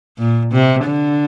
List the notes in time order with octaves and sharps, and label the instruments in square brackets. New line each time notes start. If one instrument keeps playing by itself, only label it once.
[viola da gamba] A#2
C3
D3